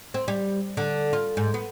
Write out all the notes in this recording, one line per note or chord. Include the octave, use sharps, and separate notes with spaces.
C4
G3
D3
F4
G#2
B3